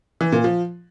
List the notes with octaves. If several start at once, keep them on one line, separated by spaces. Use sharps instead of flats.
E3
A#2
F3